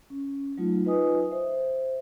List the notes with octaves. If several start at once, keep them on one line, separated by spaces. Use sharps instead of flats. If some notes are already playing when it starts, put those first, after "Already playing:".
C#4
F#3 A3 D#4 F4
D#4 F4 B4 D#5 G#5 D#6
C5 E5